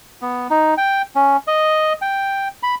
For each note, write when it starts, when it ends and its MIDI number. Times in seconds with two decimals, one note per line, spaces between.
0.22 0.47 59
0.50 0.74 63
0.78 1.02 79
1.15 1.37 61
1.47 1.93 75
2.02 2.48 79
2.63 2.75 83